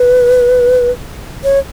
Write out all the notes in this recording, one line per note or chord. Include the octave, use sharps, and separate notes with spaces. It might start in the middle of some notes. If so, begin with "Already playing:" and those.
Already playing: B4
C#5